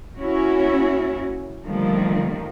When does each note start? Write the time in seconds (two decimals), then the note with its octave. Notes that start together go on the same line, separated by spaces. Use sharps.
0.18 A#3 C#4 E4 F#4
1.64 D3 D#3 F3 G3 A3 A#3